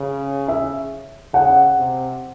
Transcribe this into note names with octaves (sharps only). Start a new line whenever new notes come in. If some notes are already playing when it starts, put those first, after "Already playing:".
Already playing: C#3
E5
C#3 F#5
C3